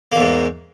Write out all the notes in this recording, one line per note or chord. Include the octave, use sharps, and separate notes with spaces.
E2 G#2 A#3